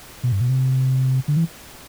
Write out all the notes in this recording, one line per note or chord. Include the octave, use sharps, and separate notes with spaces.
B2
G2
B2
C3
D3
E3